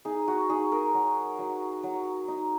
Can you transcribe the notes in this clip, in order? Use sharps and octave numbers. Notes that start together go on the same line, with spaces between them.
D#4 G#4
F#4
D#4 G#4
A#4
F#3
F#3
F#3
D#4